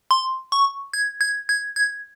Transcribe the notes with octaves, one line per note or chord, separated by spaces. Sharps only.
C6
C#6
G#6
G#6
G#6
G#6